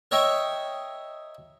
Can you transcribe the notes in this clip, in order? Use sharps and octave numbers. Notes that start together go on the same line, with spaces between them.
A#4 C#5 D#5 E5 G5